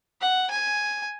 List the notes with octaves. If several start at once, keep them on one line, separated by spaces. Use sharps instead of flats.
F#5
G#5